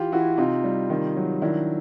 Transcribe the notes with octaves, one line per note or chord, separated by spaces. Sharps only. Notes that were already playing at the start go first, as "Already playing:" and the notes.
Already playing: E3 F4 G4
E3 E4 F#4
C3 D#4 F4
G3
D#3
F#3
D#3 D4 E4